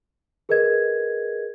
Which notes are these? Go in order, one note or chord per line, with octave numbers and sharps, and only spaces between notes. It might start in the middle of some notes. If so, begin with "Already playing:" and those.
G#4 A#4 B4 D#5 G#6